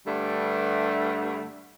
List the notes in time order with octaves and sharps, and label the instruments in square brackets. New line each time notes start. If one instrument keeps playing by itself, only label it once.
[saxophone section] G2 D3 G3 A3